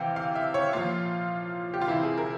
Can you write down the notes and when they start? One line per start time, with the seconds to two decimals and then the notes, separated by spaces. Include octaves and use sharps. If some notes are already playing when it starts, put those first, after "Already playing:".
Already playing: C3 E3 F5 G5
0.16 F5
0.35 E5
0.54 C#5
0.73 A#2 F3 F4
1.74 G4
1.81 F4
1.88 C3 E3 E4
2.03 G#4
2.17 A#4